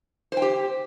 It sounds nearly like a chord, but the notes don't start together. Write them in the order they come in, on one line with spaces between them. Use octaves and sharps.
C5 G5 G4